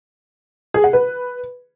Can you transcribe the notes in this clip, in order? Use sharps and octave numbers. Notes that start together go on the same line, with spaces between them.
G#4
F#5
B4